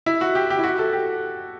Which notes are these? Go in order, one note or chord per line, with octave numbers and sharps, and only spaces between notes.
E4
F#4
G4
G4
E4
F#4
A4
G4